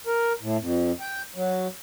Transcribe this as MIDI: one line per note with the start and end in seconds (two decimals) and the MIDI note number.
0.07 0.33 70
0.41 0.57 45
0.60 0.92 41
1.00 1.22 79
1.35 1.67 54